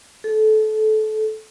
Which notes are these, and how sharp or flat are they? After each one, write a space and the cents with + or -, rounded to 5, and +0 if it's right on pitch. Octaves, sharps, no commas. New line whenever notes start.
A4 -25